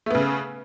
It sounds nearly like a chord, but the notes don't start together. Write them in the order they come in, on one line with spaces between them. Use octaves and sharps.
A3 B3 C#3